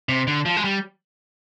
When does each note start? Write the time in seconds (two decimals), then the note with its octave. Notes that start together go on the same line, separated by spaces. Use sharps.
0.09 C3
0.27 D3
0.46 F3
0.57 G#3
0.64 G3